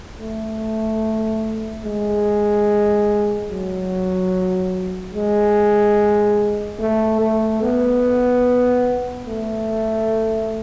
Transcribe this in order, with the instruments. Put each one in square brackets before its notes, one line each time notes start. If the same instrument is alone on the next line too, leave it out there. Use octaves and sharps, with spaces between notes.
[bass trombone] A3
G#3
F#3
G#3
A3
A3
B3
A3